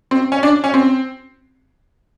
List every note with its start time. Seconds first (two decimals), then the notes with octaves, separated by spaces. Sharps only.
0.11 C4
0.32 C#4
0.43 D4
0.64 C#4
0.74 C4